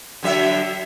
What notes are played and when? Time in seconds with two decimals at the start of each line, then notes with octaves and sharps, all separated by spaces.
0.23 D3 F#3 E5